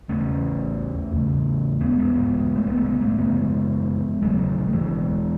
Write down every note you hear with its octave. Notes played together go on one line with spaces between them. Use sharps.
E2 C#3 A3 C#4
E2 C#3
G#3 B3
G#3 B3
G#2 G#3 B3
A3
G#3 B3
A3
G#3 B3
A3 C#4
F#2 C#3 G#3 B3
E2 C#3 F#3 A3
A3
E3 G#3